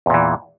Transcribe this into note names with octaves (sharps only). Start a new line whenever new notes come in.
E2 A#2 E3